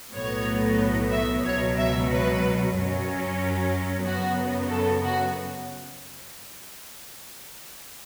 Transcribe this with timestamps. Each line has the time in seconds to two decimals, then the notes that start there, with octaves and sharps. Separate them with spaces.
0.13 B1 A2 F#3 B3 C#5
1.11 E5
1.44 C#2 B2 F#3 C#5
1.77 E5
2.09 B4
2.75 F#2 F#3 C#4
4.05 F#2 C#3 F#3 B3 F#4
4.70 A4
5.04 F#4